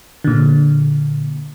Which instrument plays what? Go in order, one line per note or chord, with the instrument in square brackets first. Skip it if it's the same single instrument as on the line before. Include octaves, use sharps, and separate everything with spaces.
[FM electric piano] A#2 D3